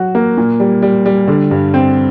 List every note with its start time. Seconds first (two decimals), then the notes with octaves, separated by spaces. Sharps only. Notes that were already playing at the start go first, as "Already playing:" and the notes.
Already playing: F#3 F#4
0.15 A#3
0.38 A#2
0.60 G3
0.82 G3
1.06 G3
1.28 D3
1.51 G2
1.74 C4